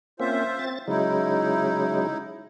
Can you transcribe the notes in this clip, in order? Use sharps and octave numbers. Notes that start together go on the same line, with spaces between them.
A#3 C4 C#4 F4 C5 E5
C4 A6
C#3 F#3 G#3 D#4 E4